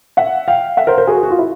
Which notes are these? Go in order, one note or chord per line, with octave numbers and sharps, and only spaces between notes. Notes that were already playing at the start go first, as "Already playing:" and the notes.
E5 F#5
F5 G5
E5 F#5
A#4 C5
A#4 C5
F#4 G#4
F#4
F4
E4